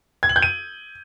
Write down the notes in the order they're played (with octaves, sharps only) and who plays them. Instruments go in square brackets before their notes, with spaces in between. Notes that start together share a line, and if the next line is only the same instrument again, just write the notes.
[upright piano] G#6
F#7
G6
D#7